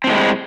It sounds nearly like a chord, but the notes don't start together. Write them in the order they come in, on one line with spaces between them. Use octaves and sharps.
C4 A2 G#3 G3